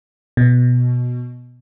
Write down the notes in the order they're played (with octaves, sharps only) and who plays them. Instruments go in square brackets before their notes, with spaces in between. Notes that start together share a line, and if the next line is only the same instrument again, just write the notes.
[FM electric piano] B2